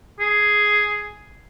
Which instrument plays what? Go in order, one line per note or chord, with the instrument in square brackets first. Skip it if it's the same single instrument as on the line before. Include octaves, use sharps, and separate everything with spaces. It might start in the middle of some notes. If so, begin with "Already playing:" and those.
[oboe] G#4